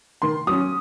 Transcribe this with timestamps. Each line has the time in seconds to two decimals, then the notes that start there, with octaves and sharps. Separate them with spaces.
0.22 D#3 C6
0.47 F#3 C#4 D#6